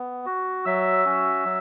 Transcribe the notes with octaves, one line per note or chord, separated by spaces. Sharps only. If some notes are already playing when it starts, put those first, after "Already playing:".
Already playing: B3
F#4
F#3 E5 E6
C#4 F#4
F#3